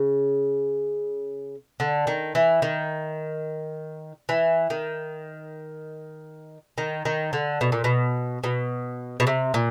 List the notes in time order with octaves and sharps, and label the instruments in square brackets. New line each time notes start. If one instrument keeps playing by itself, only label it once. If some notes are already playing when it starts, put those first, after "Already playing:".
Already playing: [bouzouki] C#3
D3
D#3
E3
D#3
E3
D#3
D#3
D#3
D3
B2
A#2
B2
B2
B2
C3
A#2